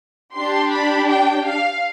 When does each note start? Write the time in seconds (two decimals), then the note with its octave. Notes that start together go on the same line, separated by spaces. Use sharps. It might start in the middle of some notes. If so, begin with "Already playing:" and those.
0.35 D4 G4 C6
0.71 B5
1.08 G5
1.45 F5